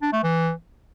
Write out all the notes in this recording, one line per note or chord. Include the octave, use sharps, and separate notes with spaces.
D4
A3
E3